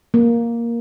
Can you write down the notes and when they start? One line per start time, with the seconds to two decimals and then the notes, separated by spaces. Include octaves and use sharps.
0.14 A#3